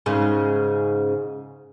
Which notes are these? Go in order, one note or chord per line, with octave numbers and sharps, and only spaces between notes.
G#2 C#3